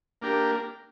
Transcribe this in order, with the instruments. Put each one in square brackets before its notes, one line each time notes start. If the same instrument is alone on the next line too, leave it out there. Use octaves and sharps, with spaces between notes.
[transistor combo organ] A#3 D4 G4 A#4